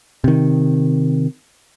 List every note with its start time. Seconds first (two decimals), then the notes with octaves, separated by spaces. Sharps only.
0.24 C3 D#3